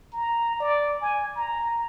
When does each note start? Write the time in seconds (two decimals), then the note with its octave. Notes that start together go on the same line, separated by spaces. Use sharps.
0.13 A#5
0.60 D5
1.01 G#5
1.36 A#5